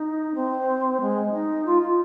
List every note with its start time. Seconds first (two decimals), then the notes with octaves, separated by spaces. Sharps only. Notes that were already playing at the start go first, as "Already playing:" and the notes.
Already playing: D#4
0.34 C4
1.00 G#3
1.32 D#4
1.65 F4
1.81 F4